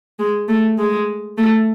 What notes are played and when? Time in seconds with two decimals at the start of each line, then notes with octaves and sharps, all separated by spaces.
0.19 G#3
0.48 A3
0.79 G#3
1.38 A3